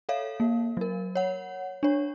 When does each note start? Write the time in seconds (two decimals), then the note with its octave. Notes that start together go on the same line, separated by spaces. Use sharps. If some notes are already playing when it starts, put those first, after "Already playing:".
0.09 A4 C#5 E5 F5
0.40 A#3
0.77 F#3 A#4
1.15 C#5 F#5
1.83 D4 C#5